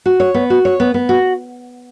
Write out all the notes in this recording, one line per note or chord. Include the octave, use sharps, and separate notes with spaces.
F#4
C#5
B3
F#4
C#5
B3
B3
F#4